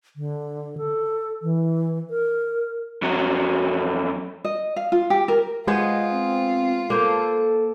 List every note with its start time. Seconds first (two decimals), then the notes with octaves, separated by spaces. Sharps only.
0.16 D3
0.78 A4
1.42 E3
2.10 A#4
3.02 F2 F#3
4.45 D#5
4.76 F5
4.92 F4
5.10 G4
5.28 A#4
5.67 G#3 B3 F4 G#4 C5 D#5
6.11 C4
6.90 A#3 A4 C5